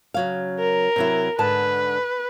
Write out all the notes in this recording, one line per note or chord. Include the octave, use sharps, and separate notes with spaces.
C#3 F#3 F5
A#4
C3 F#3 E4
G#2 D3 B4 A5